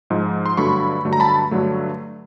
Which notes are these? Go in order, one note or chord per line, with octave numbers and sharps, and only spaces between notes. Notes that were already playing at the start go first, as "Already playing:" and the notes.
G#2 F3 G#3
C6
G2 D3 F#3 A3 B5 C#6
G2 D3 F#3 A3
A#5
A5 B5
G2 D3 F#3 A3